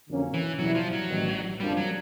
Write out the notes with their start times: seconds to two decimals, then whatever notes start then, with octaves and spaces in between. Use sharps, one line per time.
0.09 F2 D3 F#3 A#3 C#4
0.34 E3
0.58 E2 B2 F#3 G3 B3 E4
0.75 F3
0.93 F#3
1.09 A1 G2 D#3
1.60 F2 C#3 F3 G3 A#3 D4
1.77 F#3